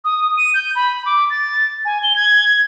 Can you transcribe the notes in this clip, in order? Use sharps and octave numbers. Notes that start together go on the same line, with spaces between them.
D#6
D#7
G6
B5
D6
A6
G#5
G7
G#6